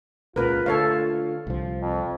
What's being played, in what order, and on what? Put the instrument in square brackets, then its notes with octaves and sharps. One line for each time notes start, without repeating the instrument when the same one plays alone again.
[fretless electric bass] C#2 A#2 C#3 [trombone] F4 [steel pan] A#4 B4
[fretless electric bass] D3 A3 [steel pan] A4 C#5 F5
[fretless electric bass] C2 F3
[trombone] F2